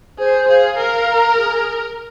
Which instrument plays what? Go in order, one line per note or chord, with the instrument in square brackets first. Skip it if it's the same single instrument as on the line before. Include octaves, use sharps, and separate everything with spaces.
[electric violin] G#4 [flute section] C5
[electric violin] G#4 [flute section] F5
[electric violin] A#4 [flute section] F5
[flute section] A#5
G#4